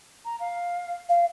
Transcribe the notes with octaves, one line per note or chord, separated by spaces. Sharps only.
A#5
F5
F5